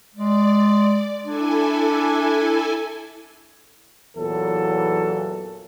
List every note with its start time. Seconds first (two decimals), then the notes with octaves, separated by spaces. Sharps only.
0.15 G#3 D5
1.25 D4 E4 A4 G#5
4.17 E2 A#2 E3 F#3 A4